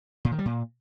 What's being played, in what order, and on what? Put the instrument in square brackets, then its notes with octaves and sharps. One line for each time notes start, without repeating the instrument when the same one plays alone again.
[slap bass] A#2
D#3
G3
A#2